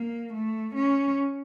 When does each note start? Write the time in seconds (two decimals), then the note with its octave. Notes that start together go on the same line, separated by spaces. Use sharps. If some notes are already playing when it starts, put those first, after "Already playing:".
Already playing: A#3
0.33 A3
0.75 C#4